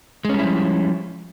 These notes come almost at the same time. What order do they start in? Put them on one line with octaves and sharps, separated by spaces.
G#3 C#4 G3 E4 F3